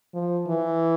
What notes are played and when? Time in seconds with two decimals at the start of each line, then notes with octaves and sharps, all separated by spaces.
0.14 F3
0.48 E3